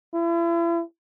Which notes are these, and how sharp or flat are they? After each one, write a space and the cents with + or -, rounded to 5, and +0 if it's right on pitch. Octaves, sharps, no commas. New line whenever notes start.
E4 +40